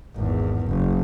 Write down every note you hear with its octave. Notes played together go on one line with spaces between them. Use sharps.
G#1 E2
F#1